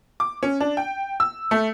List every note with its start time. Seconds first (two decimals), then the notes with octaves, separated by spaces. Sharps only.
0.20 D6
0.43 C#4
0.60 D4
0.77 G5
1.20 E6
1.51 A3